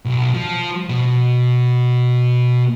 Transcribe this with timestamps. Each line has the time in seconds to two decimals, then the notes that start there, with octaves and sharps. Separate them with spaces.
0.05 B1
0.34 F3
0.89 B2